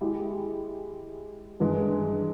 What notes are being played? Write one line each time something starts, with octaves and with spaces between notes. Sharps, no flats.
G#3 E4 G4
G2 E3 G#3